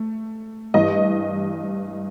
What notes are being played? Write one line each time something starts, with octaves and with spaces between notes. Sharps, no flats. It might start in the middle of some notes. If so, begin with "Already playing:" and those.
Already playing: A3
G2 E3 G3 D#5